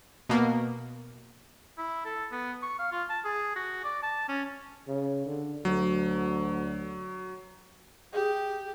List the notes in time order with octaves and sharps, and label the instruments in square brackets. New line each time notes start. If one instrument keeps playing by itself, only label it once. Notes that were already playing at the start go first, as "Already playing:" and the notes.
[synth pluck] B2 A#3
[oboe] E4
A4
B3
C#6
F5
F4
A5
G#4
F#4
D5
A5
C#4
[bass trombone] C#3
D3
[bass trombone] D2 [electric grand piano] F#3
[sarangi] G4 [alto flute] G#4